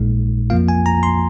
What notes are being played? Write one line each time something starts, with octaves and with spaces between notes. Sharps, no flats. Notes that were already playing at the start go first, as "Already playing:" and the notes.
Already playing: A#1 A#2 G#3 D#4
F2 F3 A#3 F4 F5
G#5
A#5
C6